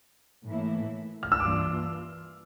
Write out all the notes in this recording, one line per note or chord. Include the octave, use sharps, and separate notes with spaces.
A2 E3 A#3 E4
F6
E6
G2 E3 A#3 D4 F4 D6